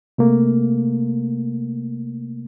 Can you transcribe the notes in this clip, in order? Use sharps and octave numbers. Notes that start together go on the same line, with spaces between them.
C3 A3 A#3